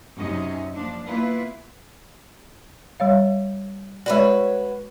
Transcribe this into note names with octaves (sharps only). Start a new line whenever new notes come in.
F#2 C3 C#4 D#4 D#5
F3 A#3 D4
A#3 B3 E4 F4 B4
G3 C#5 F5
G#3 F#4 B4 C#5 D5